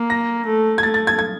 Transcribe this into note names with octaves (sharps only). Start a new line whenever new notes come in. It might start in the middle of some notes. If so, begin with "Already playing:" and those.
Already playing: A#3
A#6
A3
G#6
A3 A6
A6
G#6
G#6